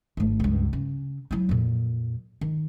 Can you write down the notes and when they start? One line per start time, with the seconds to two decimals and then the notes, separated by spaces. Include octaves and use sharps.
0.17 G#1 A3
0.40 C#2 G2
0.73 C#3
1.31 F#3 E4
1.49 F2 A#2
2.41 D#3